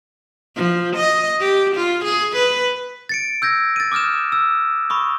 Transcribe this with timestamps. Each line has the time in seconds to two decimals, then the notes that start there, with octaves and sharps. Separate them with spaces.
0.56 F3
0.96 D#5
1.40 G4
1.76 F4
2.05 G#4
2.36 B4
3.09 A6 C#7 D7
3.42 E6 G6 G#6 A#6
3.76 A6 D#7
3.92 D6 D#6 F6 G6 E7
4.32 E6
4.90 B5 C#6 D#6